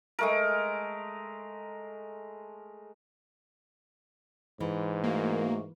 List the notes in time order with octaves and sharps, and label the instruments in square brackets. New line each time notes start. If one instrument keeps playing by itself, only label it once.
[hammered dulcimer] G#3 A3 A#4
[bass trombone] G#2 [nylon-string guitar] E3
[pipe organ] A3 F#4 [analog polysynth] A#3